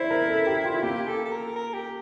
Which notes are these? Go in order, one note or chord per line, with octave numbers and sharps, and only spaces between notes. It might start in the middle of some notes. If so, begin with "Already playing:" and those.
Already playing: E4 C5 D5
A#4
A4
G4
F4
A#3 G4
A4
A4
A#4
A#4
G4